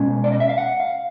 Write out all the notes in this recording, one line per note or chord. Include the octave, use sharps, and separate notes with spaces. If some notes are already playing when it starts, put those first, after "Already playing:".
Already playing: B2 G#3 C#4
D5
D#5
E5
F5
F#5
F5